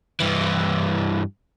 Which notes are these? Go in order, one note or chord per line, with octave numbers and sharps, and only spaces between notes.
G2 E3